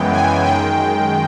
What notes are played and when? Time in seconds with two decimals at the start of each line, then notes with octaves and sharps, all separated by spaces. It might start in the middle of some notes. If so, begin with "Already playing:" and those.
Already playing: F#2 C#3 E3 G#3 B3 G5
0.12 G#5
0.44 F#2 D#3 G#3 G5